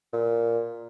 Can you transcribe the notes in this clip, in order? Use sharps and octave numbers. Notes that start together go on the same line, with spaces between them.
A#2